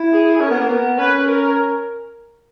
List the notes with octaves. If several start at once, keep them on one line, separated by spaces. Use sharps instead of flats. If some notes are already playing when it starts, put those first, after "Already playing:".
Already playing: E4
G#4
C#4 A#4
B3
A#3
B3
C#4 B4
A#4